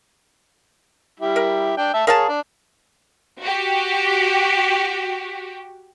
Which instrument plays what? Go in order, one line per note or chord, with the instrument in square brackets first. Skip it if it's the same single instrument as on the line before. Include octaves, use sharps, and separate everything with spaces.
[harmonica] G3 E4 G4
[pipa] A#4
[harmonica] D4 G5
E5 A5
[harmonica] G#4 C#5 [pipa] A#4 F5 A5
[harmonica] D4
[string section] F#4 G4